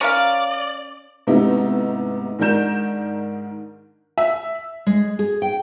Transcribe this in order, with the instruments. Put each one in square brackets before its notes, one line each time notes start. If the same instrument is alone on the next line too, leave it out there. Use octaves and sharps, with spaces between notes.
[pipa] C#4 A#4 F5 [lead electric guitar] D5
[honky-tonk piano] G#2 C3 A3 B3 D#4 E4
G#2 D#3 D4 A#4 G6 E7
[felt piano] E5
[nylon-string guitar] G#3
G#4
G5